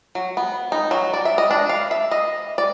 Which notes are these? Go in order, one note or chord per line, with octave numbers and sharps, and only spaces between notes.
F#3
B3
D#4
F#3
D5
E5
D#5
D4
F5
E5
D#5
D5